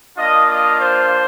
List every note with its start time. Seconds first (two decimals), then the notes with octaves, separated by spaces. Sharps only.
0.18 A#3 D4 F4 D#5
0.48 D#5
0.79 C5